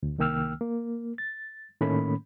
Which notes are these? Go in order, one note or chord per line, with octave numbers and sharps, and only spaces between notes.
D2
C2 D#3 A#3 G5 E6 F6
A#3
A6
A2 D#3 A3 A#3 C#4 B5